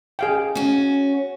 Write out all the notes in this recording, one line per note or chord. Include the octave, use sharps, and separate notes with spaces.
G#4 F5 G5
C#4 F#4